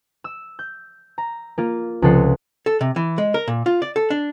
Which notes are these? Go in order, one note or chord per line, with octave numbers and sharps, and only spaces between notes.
E6
G6
A#5
A#3 F4
C#2 C3 F3 A4 F#5 C7
A4
C3
E3
G#3
A#4
A#2
F4
D5
A4
D4